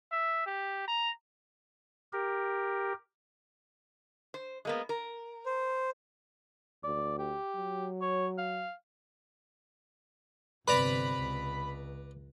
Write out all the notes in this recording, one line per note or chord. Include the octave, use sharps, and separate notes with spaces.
E5
G4
A#5
G4 A#4
C5
G#3 A#3 B3
A#4
C5
D2 D5
G4
F#3
C#5
F5
G1 C3 B4 D5 A#5 B5
C#2